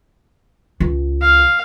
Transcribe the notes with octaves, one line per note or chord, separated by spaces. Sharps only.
C#2
F5